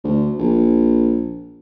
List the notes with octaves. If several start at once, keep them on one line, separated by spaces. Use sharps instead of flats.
D2
A#1